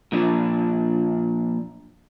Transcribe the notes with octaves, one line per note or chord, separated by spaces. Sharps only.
A#2 F3 D4